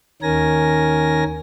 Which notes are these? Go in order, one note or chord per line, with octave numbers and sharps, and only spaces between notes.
D#2 D#3 C#4 A#4 G#5 A#6